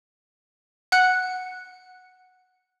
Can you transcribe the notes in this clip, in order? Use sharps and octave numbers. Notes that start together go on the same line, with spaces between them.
F#5 F#6 C#7